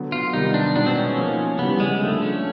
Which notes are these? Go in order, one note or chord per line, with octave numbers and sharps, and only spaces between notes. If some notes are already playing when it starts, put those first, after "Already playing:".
Already playing: D3 F#3 B3
F4
C3 D#3 G3 B3 D#4
D4
B2 G#3 B3 D4 D#4
C4
C#4
F3 A#3 D#4
C#3 E3 G3 B3
G#3
D3 F3 A3 A#3 D4
C#4